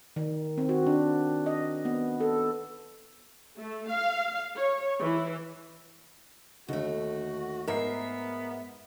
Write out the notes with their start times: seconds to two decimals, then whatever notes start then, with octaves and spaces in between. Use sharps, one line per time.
0.16 D#3
0.58 C4
0.69 F#4
0.87 D4
1.46 D#5
1.85 B3
2.20 A4
3.56 A3
3.90 F5
4.56 C#5
5.01 E3
6.68 D#2 D3 A3 F#4
7.68 G#2 B3 A#4 E5 C7